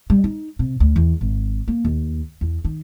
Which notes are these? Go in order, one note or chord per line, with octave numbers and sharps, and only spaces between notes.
G3
D#4
C3
D2
E2
G#1
A#3
D#2
E2
D#3